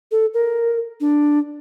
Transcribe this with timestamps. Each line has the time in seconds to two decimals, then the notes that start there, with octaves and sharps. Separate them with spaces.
0.11 A4
0.34 A#4
1.00 D4